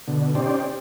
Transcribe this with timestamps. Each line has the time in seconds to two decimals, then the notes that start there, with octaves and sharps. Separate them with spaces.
0.08 B2 D3
0.35 C#4 D#4 G4 C5 D5